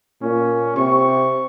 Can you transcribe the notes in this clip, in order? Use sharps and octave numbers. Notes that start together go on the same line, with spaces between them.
A#2 C#4
C3 C#6